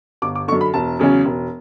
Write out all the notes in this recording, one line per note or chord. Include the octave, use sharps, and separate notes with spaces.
G1 D6
D6
F#2 D3 C#6
B5
E1 A5
E2 C#3 F#3 C#4
E1